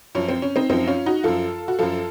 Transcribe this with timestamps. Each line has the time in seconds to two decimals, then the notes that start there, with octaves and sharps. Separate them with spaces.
0.15 F#2 F3 C#4
0.29 C4
0.42 C#4
0.56 C4 D#4
0.70 F#2 F3 C4 D#4
0.87 C#4 F4
1.06 D#4 F#4
1.24 F#2 F3 F4 A4
1.68 F#4
1.79 F#2 F3 F4 A4